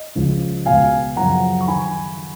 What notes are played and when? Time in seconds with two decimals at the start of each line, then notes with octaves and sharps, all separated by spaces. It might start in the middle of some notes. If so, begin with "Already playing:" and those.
Already playing: D#5
0.15 C#2 C#3 F3
0.66 C#2 B2 F5 G#5
1.16 F#2 C#3 F3 F#5 A#5
1.61 C#6
1.67 D#3 G#5 B5